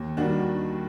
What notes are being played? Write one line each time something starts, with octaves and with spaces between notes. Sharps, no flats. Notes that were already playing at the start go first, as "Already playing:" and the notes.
Already playing: D#2
D#3 G3 D4 F#4